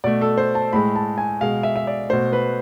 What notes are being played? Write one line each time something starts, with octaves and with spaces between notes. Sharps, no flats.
B2 A3 D5
A4
C5
A5
A2 G#3 B5
A5
G#5
B2 G#3 F5
E5
E5
D5
B2 A3 C5
B4